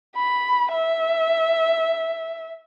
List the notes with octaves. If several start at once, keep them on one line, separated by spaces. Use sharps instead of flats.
B5
E5